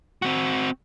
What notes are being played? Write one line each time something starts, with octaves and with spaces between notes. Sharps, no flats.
C4 F#4